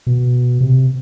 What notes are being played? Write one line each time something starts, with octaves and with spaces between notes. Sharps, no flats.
B2
C3